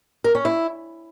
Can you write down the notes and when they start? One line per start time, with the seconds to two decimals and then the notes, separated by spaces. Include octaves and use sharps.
0.24 A#4
0.35 C#4
0.45 E4